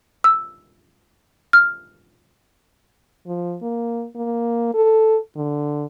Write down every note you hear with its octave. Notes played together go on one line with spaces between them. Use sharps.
E6
F6
F3
A#3
A#3
A4
D3